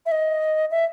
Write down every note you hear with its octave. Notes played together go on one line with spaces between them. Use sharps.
E5
D#5
E5